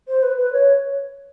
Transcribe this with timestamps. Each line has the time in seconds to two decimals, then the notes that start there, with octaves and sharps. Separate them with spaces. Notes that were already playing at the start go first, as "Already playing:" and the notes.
0.08 C5
0.23 B4
0.37 B4
0.53 C#5